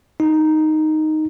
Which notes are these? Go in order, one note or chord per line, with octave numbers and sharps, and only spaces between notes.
D#4